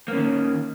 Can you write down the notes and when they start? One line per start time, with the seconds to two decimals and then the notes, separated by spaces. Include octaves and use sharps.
0.08 A#3
0.13 C#4
0.17 D#3